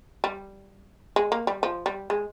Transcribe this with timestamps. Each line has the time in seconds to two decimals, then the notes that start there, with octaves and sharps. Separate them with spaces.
0.24 G3
1.16 G#3
1.32 A#3
1.47 G3
1.63 F3
1.86 G3
2.10 G#3